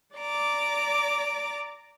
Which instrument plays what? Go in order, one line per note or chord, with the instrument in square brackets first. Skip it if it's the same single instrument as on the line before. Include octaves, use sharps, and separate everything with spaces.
[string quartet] D5 A#5 D6